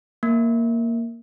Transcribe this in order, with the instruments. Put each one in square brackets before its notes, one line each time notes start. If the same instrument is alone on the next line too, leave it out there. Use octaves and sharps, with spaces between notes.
[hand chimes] A#3